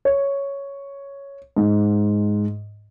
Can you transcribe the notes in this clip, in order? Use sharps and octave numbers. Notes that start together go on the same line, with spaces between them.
C#5
G#2